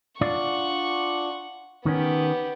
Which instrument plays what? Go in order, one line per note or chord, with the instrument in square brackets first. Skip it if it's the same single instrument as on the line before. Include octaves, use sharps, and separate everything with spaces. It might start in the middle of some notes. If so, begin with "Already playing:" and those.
[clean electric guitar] D4 F4 D5 [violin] F#5 C#6
[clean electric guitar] D#3 C#4 [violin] B3 G4